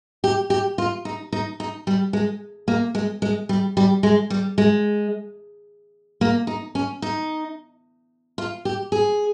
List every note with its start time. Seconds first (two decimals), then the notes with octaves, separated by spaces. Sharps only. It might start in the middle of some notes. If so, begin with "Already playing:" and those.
0.24 G4
0.50 G4
0.78 F4
1.05 D#4
1.32 D#4
1.60 D#4
1.87 G3
2.13 G#3
2.68 A#3
2.95 G#3
3.22 G#3
3.49 G3
3.77 G3
4.03 G#3
4.30 G3
4.58 G#3
6.21 A#3
6.47 D#4
6.75 C#4
7.02 D#4
8.38 F4
8.65 G4
8.92 G#4